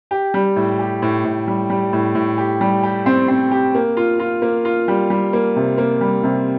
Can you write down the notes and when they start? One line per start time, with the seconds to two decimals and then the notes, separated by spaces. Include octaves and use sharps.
0.11 G4
0.34 G3
0.56 A2
0.79 G4
1.02 A2
1.25 A2
1.47 G3
1.70 G3
1.93 A2
2.15 A2
2.38 G4
2.61 G3
2.83 G4
3.06 C4
3.28 C4
3.51 G4
3.75 A#3
3.97 F4
4.20 F4
4.42 A#3
4.65 F4
4.88 G3
5.10 G3
5.33 A#3
5.56 C3
5.78 A#3
6.01 G3
6.23 C3